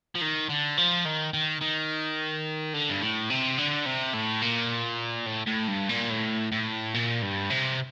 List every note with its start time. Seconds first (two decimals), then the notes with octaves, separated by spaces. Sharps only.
0.15 F3
0.21 D#3
0.50 D3
0.78 F3
1.05 D#3
1.33 D#3
1.61 D#3
2.74 D3
2.90 G2
3.02 A2
3.30 C3
3.58 D3
3.86 C3
4.14 A2
4.42 A#2
5.26 A2
5.47 A2
5.68 G2
5.89 A#2
6.10 A2
6.52 A2
6.94 A#2
7.22 G2
7.50 C3